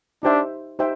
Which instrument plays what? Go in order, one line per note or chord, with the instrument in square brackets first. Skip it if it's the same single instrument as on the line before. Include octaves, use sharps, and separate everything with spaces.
[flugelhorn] D4 [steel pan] D#4 G4 C5 E5 G5
[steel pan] D#4 G4 C5 E5 G5